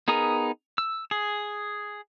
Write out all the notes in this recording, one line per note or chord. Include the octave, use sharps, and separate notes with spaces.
B3 D#4 G#4 A#4 D#6
E6
G#4